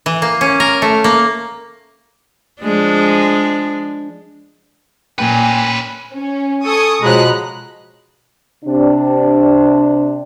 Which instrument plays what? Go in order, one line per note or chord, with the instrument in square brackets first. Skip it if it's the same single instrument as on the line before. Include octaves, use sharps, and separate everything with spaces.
[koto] E3
A#3
C#4
A#4
A3
A#3
[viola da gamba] F3 G#3 D4
[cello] A#2 [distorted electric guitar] C#4 B4 [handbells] G5 [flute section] G#5
[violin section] C#4
[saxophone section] A4 [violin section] G#5 C#6 D#6
[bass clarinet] B2 [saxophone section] F3 F#3 G#3 [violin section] A#5 B5 F#6
[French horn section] C3 D4